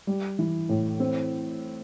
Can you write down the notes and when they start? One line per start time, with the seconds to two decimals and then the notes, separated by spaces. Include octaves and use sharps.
0.07 G3
0.39 E3
0.69 A2
1.00 C4